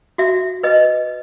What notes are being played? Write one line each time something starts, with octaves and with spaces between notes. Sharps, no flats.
F#4 E5
B4 D#5